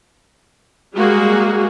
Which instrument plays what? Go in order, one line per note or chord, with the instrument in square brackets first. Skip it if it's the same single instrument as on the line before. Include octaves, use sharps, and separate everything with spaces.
[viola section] G3 G#3 A#3 F#4 G#4